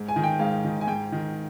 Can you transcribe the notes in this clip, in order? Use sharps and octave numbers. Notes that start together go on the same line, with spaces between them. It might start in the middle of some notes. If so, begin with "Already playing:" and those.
Already playing: G#2
G#5
D#3
G5
G#2 F5
D#3
G#5
G#2 G5
D#3